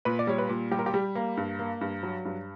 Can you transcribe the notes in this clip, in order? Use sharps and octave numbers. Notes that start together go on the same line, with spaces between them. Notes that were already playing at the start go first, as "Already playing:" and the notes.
A#2 B4
D5
G3 C#5
B4
A#2
G3 G4
A#4
G4
G3
A#3
G2
A#3
G2
F#3
G2